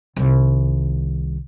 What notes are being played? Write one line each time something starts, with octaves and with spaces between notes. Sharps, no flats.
C2 D#3